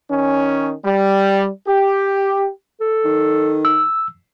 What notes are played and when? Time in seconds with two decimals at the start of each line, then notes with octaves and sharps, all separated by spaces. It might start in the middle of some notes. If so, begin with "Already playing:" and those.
0.11 D#3 C#4
0.85 G3
1.68 G4
2.80 A4
3.04 D#3
3.65 E6